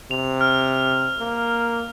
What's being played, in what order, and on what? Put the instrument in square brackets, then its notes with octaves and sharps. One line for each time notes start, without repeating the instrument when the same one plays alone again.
[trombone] C3 [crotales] F7
[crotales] F6
[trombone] A#3